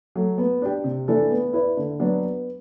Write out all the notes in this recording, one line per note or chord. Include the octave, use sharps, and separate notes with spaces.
F#3 A3
B3
D4 G4
C3
E3 A3 D4 A4
B3
E4 B4 D5
D3
F#3 B3 D4
B3